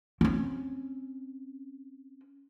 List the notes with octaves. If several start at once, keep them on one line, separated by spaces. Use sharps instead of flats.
C4 C#4